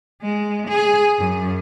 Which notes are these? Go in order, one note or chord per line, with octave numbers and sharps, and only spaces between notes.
G#3
G#4
F#2